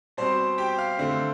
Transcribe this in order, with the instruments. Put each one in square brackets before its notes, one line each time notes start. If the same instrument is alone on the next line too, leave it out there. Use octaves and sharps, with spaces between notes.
[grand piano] B2 G3 C4 C5 C6
G4 G5
F5 F6
D3 A3 C4